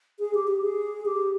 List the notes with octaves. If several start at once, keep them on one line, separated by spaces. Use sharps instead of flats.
G#4
G4
G4
G#4
G4